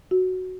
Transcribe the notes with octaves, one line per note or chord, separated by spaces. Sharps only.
F#4